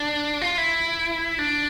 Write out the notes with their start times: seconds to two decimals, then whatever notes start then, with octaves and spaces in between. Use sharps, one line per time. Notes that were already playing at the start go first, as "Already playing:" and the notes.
Already playing: D4
0.42 F4
0.58 E4
1.39 D4